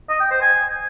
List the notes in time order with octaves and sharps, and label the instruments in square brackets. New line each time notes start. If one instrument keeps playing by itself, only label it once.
[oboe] D#5
G5
C5
G#5